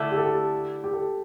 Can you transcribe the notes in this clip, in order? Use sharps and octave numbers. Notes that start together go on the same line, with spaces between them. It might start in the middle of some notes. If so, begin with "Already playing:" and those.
Already playing: D3 A3 E4
G4
A4
G4
G4
A4